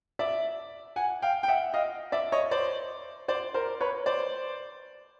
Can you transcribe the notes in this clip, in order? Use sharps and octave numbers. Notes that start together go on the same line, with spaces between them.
D5 E5
F#5 G#5
F5 G5
G5
E5 F#5
D#5 F5
D5 E5
C#5 D#5
C5 D5
C5 D5
A#4 C5
B4 C#5
C5 D5